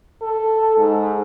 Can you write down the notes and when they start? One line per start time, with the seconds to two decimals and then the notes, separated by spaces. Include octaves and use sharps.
0.21 A4
0.78 G#2